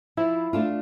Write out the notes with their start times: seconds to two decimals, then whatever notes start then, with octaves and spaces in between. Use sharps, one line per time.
0.17 F3 E4
0.53 A3 D4 F4